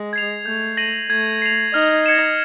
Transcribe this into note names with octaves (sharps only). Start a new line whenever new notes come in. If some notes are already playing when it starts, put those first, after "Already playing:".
Already playing: G#3
G#6 C7 F7
A3 G6
A#6 D#7 F#7
A3 G#6
C7 F7
D#4 F6
G#6 C#7 E7